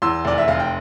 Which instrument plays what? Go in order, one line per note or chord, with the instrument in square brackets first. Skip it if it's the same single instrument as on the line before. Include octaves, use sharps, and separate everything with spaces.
[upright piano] E2 C6 E6
F1 D5
E5
F1 F5
G5